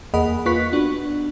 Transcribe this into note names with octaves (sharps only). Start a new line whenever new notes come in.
E2 A#3 G#4 D#5 F#5 B5
A#3 F4 B4 C#6 F#6 B6
B3 D4 F#4